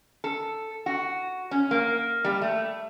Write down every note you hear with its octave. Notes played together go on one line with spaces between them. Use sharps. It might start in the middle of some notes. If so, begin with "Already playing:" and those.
A4
F#4
C#4
A#3
G3
A3